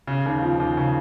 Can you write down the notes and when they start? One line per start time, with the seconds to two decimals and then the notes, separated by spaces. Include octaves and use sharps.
0.07 C#3
0.26 D#2
0.42 F3
0.60 D#2
0.77 C#3